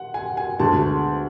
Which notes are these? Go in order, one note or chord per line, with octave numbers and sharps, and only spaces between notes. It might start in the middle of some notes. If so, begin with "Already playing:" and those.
Already playing: F#5
G#5
G#5
D2 D3 G#3 B3 A5